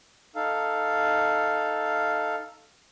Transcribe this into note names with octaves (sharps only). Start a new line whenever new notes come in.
D#4 A4 F5